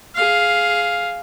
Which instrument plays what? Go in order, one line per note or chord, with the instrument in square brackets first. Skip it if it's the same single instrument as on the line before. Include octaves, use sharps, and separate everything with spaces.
[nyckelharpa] G#4 F5